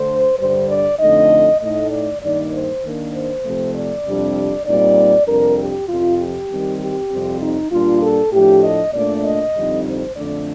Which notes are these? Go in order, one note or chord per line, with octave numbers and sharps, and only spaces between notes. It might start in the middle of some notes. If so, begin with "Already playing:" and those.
Already playing: D3 A3 D4 C5
G2 D3 G3 C5
D5
F2 D3 A3 D#4 D#5
A2 A3 D#4 D#5
D5
G2 D#3 A#3 D#4 D5
C5
D#3 A#3 D4
C5
C3 F3 A3
D5
F2 C3 G3 D4
A#2 G3 C4 D#4 D5
F2 C3 G3 D4 A#4
G4
F2 C3 F3 F4
G4
D#3 G3 C4
G4
F2 C3 G3 C4
D#4
A#2 G3 D4 F4
A4
A2 F3 A3 D4 G4
D#5
A#2 A3 D4 D5
D#5
F2 D3 G3 C4 D#4
C5
F2 D3 A3 D4 D5